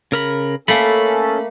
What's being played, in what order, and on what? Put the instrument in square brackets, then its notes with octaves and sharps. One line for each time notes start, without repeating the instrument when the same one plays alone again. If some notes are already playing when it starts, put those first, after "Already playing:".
[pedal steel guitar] C#3 A#4 B5
[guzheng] A3 A#3 [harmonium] C#4 A4 [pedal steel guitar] B5